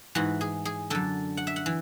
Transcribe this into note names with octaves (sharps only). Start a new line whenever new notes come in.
G#2 E3 F#4
G#4
G#4
F#2 D3 A4
F#5
E5
F#5
E3